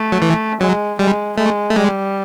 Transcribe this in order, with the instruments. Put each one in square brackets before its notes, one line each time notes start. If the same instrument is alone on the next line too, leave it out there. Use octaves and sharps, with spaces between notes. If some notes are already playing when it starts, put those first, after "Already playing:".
Already playing: [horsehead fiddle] A3
[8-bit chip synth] F#3
E3
[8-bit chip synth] F#3 [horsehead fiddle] G#3
[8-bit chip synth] G3 [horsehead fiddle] G#3
[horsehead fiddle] G#3 [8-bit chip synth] A3
[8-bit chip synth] A3
[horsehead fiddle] G3 [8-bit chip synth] G#3